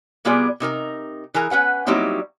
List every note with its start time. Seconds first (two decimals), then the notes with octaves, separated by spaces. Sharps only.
0.25 C3 G3 B3 F4 G#4 D5
0.60 C3 D#4 A#4 A#5
1.34 E3 G#4 A#4 A#5
1.50 C#4 B4 F#5 G#5
1.86 F#3 G3 A#3 C4 D#4 E4